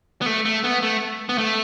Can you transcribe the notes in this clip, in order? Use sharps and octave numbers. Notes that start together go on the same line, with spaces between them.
B3
A3
A3
B3
A3
B3
A3